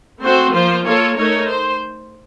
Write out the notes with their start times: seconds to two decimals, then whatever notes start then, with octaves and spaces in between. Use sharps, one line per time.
0.21 A3 C4 F#4 C5
0.53 F3 A#3 F4 C5
0.84 A#3 F4 A4 C#5
1.16 A3 D#4 A#4 C#5
1.48 C5